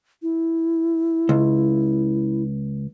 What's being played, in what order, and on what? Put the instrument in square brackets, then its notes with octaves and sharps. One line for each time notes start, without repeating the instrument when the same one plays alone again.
[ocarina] E4
[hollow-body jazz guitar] C#2